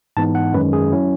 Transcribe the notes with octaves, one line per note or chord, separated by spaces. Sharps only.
G#2 E3 B3 D#4 A5
F#5
F#2 D#3 G#3 C#4 B4
G#4
F#3 C#4 E4